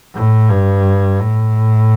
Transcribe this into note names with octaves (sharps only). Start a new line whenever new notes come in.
A2
G2
A2